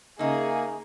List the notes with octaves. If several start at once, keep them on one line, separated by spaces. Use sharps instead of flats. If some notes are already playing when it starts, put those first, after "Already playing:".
C#3 A#3 D#4 G#4 E5